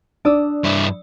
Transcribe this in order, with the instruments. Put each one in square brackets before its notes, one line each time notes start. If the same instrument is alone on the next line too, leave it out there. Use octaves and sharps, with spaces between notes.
[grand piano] D4 [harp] D5 D#6 E6
[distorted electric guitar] G2 E4